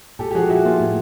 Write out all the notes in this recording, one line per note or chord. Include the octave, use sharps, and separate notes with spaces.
A#2 G4 A4
G4
F3 F#4 G#4
F3 E4 F#4
A#3 F4
A2